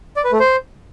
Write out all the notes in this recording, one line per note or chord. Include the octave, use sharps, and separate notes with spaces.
D5
B4
A3
C5